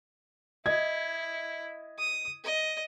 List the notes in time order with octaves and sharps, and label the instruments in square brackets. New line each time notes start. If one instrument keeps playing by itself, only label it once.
[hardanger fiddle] E4 [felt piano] D#5 G#6
[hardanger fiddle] D#6
D#5